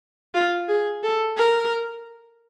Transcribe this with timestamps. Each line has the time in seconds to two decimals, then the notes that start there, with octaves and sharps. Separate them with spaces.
0.34 F4
0.68 G#4
1.03 A4
1.37 A#4